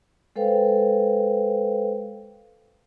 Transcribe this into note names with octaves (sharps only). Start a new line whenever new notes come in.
G#3 A4 B4 C5 F5 G5